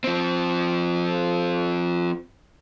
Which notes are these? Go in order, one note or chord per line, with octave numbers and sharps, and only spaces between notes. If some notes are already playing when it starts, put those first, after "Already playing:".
F3 C4